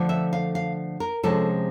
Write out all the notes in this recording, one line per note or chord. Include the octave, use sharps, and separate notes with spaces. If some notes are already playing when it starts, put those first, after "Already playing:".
Already playing: D3 F3 A3 D4
E5
F5
F5
A#4
C3 F3 G#3 C#4 A4